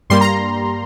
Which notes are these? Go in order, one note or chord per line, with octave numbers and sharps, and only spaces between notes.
G2 G3 A#3 C6
A#5